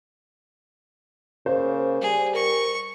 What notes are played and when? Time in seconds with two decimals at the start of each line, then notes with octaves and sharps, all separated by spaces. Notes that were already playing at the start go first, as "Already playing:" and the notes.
1.46 C#3 A#3 C5
2.02 G3 G#4
2.35 A#4 C#6